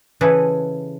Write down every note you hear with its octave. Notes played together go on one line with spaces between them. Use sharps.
C#3 E3 G#4 A4 B4